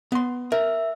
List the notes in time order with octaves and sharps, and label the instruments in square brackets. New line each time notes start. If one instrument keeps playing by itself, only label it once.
[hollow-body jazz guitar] B3 C6
[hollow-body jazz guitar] A#4 [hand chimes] E5